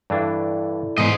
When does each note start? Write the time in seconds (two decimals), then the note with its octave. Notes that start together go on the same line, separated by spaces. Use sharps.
0.10 G2 E3 D4 E4 A4 D5
0.98 G#2 B2 E3 C5 D#5